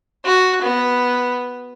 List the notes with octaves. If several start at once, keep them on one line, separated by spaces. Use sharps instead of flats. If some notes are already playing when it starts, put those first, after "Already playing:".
F#4
B3